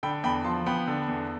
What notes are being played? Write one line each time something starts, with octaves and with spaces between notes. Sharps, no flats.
D3 G5 B5
E2 G5 B5
F3 A5 C6
B3 G5 B5
D3
E2